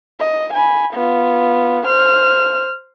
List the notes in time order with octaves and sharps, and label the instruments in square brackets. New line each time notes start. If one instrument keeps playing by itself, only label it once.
[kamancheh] D#5
G#5 B5
B3 F4
C5 F6